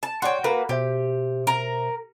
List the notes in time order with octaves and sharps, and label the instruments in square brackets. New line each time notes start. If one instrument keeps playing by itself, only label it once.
[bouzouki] A5
[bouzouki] F#4 G5 [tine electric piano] C#5 D5 C6
[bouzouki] A#3 F#4 B4 [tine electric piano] B5
[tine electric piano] B2 C5 E5 [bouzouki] G4
[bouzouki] A#4